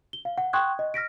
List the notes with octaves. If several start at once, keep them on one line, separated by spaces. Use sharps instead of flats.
G7
F5
F#5
G5 C6 C#6 D#6 F#6 G#6
D#5
F6 A#6 B6 D7